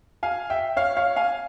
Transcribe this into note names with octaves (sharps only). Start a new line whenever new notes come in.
F5 G#5
E5 G5
C#5 F5
C#5 F5
F5 G#5